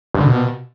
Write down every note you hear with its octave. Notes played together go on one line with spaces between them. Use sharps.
G2
D3
B2